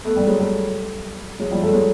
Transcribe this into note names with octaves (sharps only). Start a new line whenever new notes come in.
A3 B3
G3 A3
F#3 G#3
G3 A3
F#3 G#3
F3 G3
G3 A3
F#3 G#3